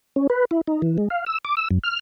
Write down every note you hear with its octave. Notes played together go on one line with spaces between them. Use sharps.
C#4
B4
E4
D#4
E3
G#3
F5
E6
D6
E6
F#2
F6